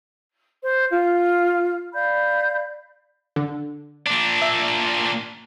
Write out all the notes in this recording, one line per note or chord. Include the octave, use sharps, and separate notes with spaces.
C5
F4
D5 F5 B5 G6
D3
A#2 D4
E5